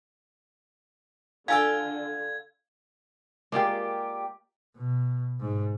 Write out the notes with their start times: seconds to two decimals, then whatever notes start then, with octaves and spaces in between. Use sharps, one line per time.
1.48 D3 F4 A4 F5 G5 G#5 E6 G#6
3.52 G#3 A#3 F4 G4 D5
4.77 B2
5.40 G#2